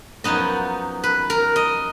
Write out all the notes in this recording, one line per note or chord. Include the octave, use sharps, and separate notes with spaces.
F#2 F3 B3 D#4 D#5
B4
A#4
D#5